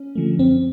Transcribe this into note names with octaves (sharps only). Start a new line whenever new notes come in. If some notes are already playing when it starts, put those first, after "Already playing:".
Already playing: C#4
D3 F3 A3
F#2 C4